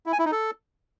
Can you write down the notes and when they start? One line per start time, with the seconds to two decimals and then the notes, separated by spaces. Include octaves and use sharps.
0.06 E4
0.13 G#5
0.19 E4
0.25 D#4
0.32 A4